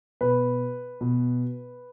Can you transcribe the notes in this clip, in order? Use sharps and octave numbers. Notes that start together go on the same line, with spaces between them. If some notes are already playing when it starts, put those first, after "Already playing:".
B2 B4
B2